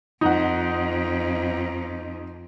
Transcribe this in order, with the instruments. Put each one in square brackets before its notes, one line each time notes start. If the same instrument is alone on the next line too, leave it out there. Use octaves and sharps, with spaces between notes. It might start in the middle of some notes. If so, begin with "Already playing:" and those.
[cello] F2 [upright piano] D#4 F#5